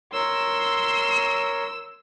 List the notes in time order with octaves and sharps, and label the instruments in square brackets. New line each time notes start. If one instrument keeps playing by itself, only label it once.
[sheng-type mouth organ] A#4 C#5 [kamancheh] C6 [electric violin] E6